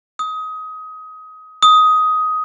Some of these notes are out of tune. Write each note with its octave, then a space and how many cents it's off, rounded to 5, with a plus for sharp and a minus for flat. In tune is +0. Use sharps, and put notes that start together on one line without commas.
D#6 +25
D#6 +15